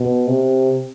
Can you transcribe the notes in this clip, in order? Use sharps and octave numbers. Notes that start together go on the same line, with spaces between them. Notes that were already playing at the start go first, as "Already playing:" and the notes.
Already playing: B2
C3